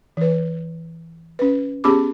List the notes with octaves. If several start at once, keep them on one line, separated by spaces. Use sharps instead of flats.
E3 B4
C#4 B4
B3 C#4 G4 G#4 B5 D6